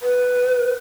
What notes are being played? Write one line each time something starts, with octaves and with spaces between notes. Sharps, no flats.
B4